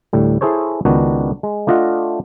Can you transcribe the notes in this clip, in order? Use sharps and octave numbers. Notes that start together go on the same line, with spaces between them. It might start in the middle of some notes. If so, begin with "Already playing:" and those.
D2 A2 G3
E4 G#4 A4 C5 C#5
C#2 D#3 B3 D4 F#4
G#3
A3 D4 F4 D#5 F#5